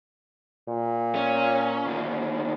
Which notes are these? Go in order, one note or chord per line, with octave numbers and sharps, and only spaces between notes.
A#2
C#4
D#2 D3